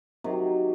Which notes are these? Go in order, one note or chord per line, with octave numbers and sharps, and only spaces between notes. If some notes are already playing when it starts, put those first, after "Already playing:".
C3 D#3 F#3